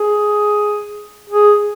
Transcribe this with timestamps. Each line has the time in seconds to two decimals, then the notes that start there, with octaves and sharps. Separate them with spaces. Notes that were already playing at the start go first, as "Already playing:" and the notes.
Already playing: G#4
1.29 G#4